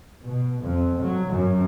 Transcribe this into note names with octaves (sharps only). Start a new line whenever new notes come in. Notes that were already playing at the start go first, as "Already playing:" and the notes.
B2
F2
F#3
F#2